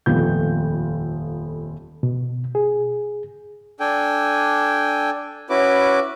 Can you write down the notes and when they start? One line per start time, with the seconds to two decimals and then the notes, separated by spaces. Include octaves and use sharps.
0.06 D#1 F2 A3 B3 F4 G6
2.03 B2
2.55 G#4
3.80 D4 A4 G5 G#5
5.50 C#4 E4 F#4 B4 D6